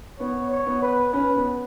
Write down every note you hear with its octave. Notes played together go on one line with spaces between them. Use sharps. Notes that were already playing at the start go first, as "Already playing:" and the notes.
B3 C#5
C#5
B3
B4
C#4 B4
B3